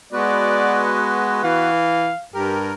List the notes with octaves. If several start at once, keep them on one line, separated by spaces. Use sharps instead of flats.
G#3 B3 F#4 B4 D5
E3 F5
G2 G4 A#4